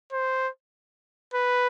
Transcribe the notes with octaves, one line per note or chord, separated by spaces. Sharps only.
C5
B4